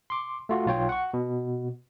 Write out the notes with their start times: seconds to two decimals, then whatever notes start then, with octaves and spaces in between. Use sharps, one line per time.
0.10 C6 D6
0.49 A3 F4 F#4
0.66 B1 F4 C#5 G5
0.89 F#5 C#6
1.14 B2